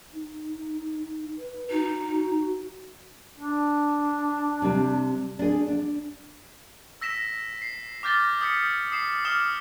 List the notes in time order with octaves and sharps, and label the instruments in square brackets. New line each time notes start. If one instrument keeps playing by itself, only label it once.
[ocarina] D#4
B4
[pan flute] D#4 [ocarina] F#4
[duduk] D4
[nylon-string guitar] C3 G3
D4 G#4
D4
[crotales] E6 A#6 B6 E7
C7
D6 F6 G6 A6 A#6 G7
D#6 G6 B6 C#7
D#6 C7 E7
D6 D#6 F6 E7 G7